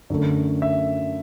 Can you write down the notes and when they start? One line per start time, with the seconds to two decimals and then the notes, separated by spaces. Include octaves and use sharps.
0.10 F#2 D3 A3
0.62 E5